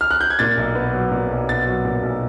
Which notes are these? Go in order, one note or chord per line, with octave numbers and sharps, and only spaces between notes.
F6
F#6
G6
G#6
A#2 A6
B1
B3
F#3
A#2
B1
B3 A6
F#3
A#2
B1